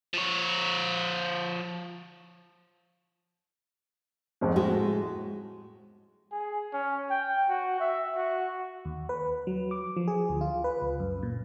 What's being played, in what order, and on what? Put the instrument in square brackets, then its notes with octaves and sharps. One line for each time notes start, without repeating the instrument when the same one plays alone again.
[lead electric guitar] F3 C#5
[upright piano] G#1 F2 G#2
[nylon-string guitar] A2 G#3 [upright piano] F#4
[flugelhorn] G#4
C#4
G5
F#4
E5
F#4
[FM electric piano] D#2
B4
F#3
D6
F3
G#4
D2
F4
B4
C#2
F#2
A#2